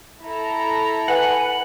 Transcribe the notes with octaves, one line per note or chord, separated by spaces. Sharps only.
E4 A4 A#5
B4 F#5 G#5